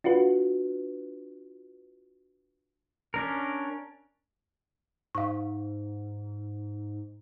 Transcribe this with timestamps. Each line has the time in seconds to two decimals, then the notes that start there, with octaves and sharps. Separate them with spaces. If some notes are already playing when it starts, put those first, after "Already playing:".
0.04 D4 F4 F#4 B4
3.14 C#4 D4 A#4
5.15 G#2 F5 C#6